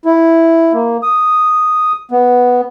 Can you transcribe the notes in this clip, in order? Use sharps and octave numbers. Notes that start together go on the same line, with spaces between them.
E4
A#3
D#6
B3